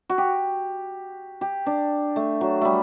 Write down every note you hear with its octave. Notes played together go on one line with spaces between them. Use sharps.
F#4
G4
G4
D4
A3
F#3
G3 A3